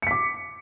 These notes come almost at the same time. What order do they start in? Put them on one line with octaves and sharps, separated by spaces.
C#7 B6 D6